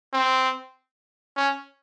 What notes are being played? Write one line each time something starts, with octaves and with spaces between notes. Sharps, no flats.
C4
C#4